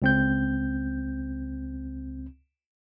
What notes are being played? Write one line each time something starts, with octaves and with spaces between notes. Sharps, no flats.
C#2 C4 G6